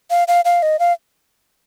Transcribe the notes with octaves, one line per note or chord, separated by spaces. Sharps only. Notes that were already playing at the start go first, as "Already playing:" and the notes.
F5
F5
F5
D#5
F5